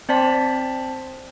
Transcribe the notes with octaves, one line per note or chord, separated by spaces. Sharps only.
C4 C5 D5 A5 B6